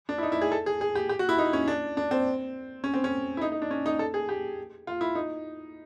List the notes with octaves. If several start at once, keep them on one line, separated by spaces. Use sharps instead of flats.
D4
E4
D#4
E4
G#4
A4
G#4
G#4
G4
G4
F#4
E4
D#4
C#4
D4
D4
C4
C#4
C4
C#4
E4
D#4
D#4
D4
C#4
D#4
A4
G#4
G4
F4
E4
D#4